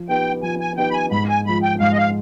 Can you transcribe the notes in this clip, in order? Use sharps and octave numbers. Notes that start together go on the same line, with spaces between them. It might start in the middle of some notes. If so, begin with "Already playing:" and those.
Already playing: F3
B3 D#4 G4 B4 G5
F3 G#5
G#5
B3 D#4 G4 B4 G5
B5
G#5
G#2 B5
G#5
F3 G#3 B5
G5
G#2 F5
D#5
F5